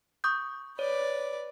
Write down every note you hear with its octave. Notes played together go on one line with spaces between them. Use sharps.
C#6 D#6 G6
B4 C#5 D5